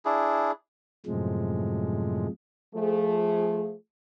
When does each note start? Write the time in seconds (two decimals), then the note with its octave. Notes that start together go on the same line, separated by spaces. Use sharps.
0.05 D4 E4 G#4
1.06 F#2 A2 C3 F3 G#3
2.75 F3 A3 G#4